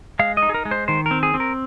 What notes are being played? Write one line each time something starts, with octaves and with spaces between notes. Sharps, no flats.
G#3 F5
D#5
D#4
G#4
A#4
G#3
C5
D#3 C5
A#4
C4
G#4
C4
A#4